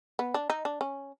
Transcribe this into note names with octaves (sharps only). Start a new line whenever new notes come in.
B3
D4
D#4
D4
C#4